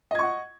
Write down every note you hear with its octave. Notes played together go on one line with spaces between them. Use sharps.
D#5 F#5 C#6 G#6